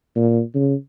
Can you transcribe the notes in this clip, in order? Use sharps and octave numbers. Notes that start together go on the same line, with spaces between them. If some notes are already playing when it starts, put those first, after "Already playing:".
A#2
C#3